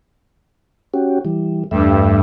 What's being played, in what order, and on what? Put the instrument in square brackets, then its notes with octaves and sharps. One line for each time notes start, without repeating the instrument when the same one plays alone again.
[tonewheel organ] C#4 F#4 G4
E3 G3
[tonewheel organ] E2 A3 E5 [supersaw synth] G2